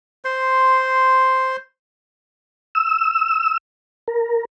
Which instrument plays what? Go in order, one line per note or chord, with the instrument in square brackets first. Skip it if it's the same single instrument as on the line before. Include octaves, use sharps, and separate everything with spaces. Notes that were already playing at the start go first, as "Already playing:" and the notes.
[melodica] C5 C6
[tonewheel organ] E6
A#4